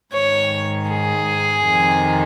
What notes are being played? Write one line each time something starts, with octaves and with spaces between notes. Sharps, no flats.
G#2 D#3 C#5
G#4
F2 C3 D#3